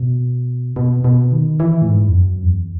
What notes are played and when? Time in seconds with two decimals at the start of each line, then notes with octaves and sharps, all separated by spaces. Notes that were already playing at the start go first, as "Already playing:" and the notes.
Already playing: B2
0.76 B2
1.04 B2
1.32 D#3
1.60 E3
1.82 A2
1.87 G#2
2.08 E2
2.14 F#2
2.43 E2